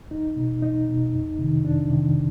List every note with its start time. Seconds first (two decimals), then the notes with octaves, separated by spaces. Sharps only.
0.11 E2 D#4
0.36 B2
0.62 E2 D#4
0.88 B2
1.13 F2
1.39 C3 D#3
1.65 F2 D4
1.90 C3 D#3